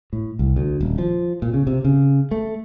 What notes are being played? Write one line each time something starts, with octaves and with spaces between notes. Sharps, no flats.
A2
C2
D2
D#1
F3
A#2
C#3
C3
C#3
A3